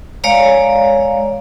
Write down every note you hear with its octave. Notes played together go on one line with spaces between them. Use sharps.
G#3 C#5 D5 F5 A#5